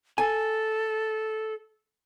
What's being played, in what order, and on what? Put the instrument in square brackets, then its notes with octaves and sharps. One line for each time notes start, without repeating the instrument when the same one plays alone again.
[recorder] A4 [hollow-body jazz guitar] G#5